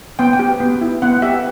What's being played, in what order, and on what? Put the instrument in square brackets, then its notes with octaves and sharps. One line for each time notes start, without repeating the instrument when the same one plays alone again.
[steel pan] B3 G5
G5
G4
B3
E4
B3 F#5
G4 E5